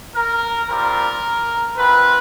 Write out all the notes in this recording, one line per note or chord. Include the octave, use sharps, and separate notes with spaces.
A#4
G3 C4 F4 A#4
C4 F4 B4